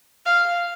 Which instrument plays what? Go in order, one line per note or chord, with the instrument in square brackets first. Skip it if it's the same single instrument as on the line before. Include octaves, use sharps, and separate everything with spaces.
[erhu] F5